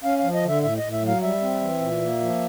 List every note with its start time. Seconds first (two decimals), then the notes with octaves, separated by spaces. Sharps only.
0.04 C#4 F5
0.19 F3 F5
0.34 D#5
0.43 D3 E5
0.63 A2 E5
0.78 A2 D#5
0.92 E5
1.02 F#3
1.07 F5
1.22 G3 E5
1.41 C4
1.61 E3
1.81 A#2
2.01 A#3
2.21 F3